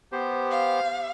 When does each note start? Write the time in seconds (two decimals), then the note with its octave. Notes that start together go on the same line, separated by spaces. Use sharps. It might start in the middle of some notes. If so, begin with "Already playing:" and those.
0.12 B3 G4 C5
0.51 F5